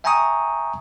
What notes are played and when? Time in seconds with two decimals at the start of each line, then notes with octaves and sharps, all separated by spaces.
0.04 E5 G5 G#5 A#5 C#6 D#6